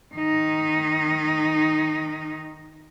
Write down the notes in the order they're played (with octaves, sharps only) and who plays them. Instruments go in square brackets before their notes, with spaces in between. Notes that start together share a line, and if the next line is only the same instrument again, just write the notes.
[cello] D#3 D#4